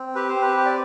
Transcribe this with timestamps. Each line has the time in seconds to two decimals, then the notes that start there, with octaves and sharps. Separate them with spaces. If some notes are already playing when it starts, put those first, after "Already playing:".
Already playing: C4
0.15 G4 B4
0.29 C5
0.36 C4
0.42 B4
0.57 G4
0.65 D5